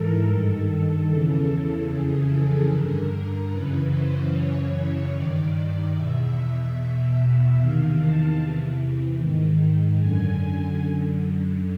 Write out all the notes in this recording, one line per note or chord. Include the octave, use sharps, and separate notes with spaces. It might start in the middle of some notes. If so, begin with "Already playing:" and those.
Already playing: G#2 E3 A4 A#4
G2 D#3 A4
E2 C#3 E3
F2 C#3 E3 G#4
A4
G2 D3 A#4
F#2 C#3 E3 B4
C5
F#2 C#3 E3 C#5
G2 D#3 D5
E2 B2 E5
E2 B2
E2 C3 D#3 F5
A5
E2 C3 E3
G#2 D#3
F#2 D3 G#5
F#2 D3